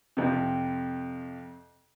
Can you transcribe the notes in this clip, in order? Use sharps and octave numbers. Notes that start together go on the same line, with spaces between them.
F2 C3